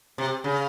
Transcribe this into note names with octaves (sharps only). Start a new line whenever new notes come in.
C3
C#3